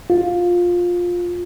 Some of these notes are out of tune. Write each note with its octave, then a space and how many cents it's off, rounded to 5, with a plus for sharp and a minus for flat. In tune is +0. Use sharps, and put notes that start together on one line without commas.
F4 +15